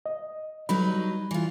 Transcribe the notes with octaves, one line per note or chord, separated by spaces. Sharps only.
D#5
F#3 G3 D#4 B4 B5
E3 F4